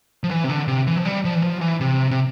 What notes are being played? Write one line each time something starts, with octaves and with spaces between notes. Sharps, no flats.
F3
E3
C3
D3
C3
E3
F3
G3
F3
E3
F3
E3
C3
C3